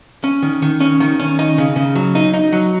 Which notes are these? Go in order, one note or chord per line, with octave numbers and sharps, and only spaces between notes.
C#4
D#3
D#3
C#4
D#3
C#4
D#4
C#3
C#3
F#3
D#4
D#4
F#3